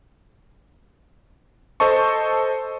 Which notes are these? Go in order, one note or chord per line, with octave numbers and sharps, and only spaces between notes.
A4 C5 D#5 A5 C#6